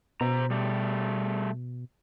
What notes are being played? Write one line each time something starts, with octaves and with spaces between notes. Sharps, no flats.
B2 C5 A#5
G3 A3